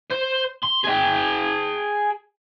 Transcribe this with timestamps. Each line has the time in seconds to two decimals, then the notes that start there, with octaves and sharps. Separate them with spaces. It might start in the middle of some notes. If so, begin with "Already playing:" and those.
0.10 C5
0.63 C6
0.84 G#4 G5